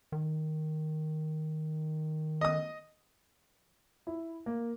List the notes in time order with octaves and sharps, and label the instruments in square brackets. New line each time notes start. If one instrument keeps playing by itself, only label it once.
[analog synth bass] D#3
[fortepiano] D#5 D#6
[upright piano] E4
A#3